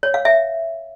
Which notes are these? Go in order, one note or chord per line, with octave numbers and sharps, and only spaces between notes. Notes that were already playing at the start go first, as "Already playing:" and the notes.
C#5
F5
E5